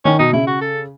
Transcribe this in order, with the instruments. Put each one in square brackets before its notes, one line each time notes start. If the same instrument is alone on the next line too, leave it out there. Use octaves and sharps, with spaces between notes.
[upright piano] D#3 [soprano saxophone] C#4
[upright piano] B2 [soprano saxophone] D#4
[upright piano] C#3 [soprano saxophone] E4
[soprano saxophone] F#4
A4